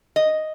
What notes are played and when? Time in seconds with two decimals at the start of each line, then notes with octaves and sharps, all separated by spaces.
0.16 D#5